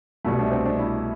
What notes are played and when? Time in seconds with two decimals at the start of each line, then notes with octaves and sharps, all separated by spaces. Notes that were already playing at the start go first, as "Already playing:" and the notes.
0.25 C2 B2 A3
0.39 D4
0.51 C4
0.66 D4
0.79 E4